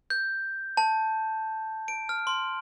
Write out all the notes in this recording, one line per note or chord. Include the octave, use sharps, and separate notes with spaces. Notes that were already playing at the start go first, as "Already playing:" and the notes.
G6
A5
D7
F6
C6